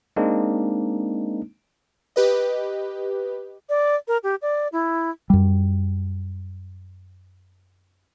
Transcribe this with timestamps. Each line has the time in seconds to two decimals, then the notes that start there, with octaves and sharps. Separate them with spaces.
0.16 G#3 A#3 C4 D4 D#4
2.16 G4 B4 D#5
3.69 D5
4.08 A#4
4.23 G4
4.42 D5
4.72 E4
5.30 F#2 G3